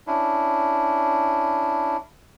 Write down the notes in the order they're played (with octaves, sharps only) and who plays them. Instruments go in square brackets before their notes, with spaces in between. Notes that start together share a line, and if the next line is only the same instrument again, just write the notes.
[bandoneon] C#4 D4 E4